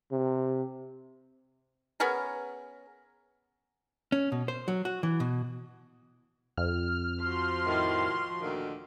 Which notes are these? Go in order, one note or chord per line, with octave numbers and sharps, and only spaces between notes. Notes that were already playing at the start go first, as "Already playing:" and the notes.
C3
B3 C#4 G#4 A#4
C#4
B2
C5
F#3
F#4
E3
B2
F2 F6
F3 F#4 C6
A2 D#3
D2 A#2 D#3